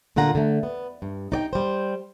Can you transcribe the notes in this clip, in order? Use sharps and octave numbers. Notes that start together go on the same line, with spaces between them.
A#2 D3 F4 F#5 A#5
D3 A3
B3
G2
D#4 D5 G5
G3 C5